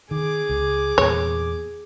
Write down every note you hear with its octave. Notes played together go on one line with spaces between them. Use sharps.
D#3 G#4 D6
C#2
E2 A#2 C#5